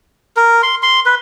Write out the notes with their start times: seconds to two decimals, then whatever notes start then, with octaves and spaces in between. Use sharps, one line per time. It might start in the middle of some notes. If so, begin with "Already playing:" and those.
0.37 A#4
0.63 C6
0.82 C6
1.06 B4